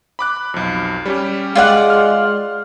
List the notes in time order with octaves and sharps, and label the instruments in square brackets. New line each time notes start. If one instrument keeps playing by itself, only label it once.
[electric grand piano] B5 D6 F#6
B1 F2
G3 C#4 G4
[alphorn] G#3 [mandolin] F4 D5 F#5
[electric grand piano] C6 F6